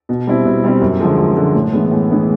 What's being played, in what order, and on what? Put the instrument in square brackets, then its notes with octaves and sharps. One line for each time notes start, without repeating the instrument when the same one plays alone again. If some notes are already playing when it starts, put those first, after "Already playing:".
[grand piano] B2
G3 C4 E4
B2
G3 C4 E4
F#2
D3 F3 G#3
F#2
D3 F3 G#3
A2
E3 G#3 B3
A2
E3 G#3 B3